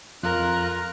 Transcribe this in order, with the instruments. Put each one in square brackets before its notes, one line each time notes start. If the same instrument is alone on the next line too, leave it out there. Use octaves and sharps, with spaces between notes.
[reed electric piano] F2 [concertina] F4 F#6 [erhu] A#4